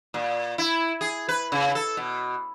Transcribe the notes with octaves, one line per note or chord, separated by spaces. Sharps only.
A#2
E4
G#4
B4
C#3
A4
B2